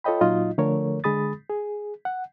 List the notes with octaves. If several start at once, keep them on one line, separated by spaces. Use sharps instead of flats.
F4 A4 C#5 D#5 G5 B5
A#2 F#3 D#4 F4 D#5
D3 F3 A3 A#4 C#5
D3 G#3 G#4 B5 D#6 A6
G#4
F#5